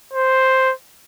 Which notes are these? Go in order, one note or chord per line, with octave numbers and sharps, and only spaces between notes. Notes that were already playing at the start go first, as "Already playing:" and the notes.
C5